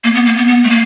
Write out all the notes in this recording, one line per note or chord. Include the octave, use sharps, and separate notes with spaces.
A#3
B3
A#3
B3
B3
A3
A#3